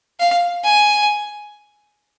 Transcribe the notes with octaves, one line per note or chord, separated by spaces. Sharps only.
F5
G#5